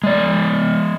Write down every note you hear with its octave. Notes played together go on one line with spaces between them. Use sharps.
G#3 D5